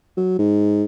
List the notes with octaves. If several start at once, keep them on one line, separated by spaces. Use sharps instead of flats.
F#3
G#2